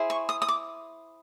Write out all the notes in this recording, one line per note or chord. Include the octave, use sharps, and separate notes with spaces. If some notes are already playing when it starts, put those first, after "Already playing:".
Already playing: E4 G#4 C5
C#6
D#6
D#6
D6